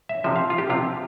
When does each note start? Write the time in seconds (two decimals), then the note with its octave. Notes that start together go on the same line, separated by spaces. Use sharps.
0.09 E5
0.24 C3 F3 E5
0.36 F5
0.50 F4
0.58 G4
0.70 C3 F4
0.74 F3